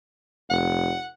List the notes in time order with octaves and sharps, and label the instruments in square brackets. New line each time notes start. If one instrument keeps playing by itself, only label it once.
[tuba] F1 [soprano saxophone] F#5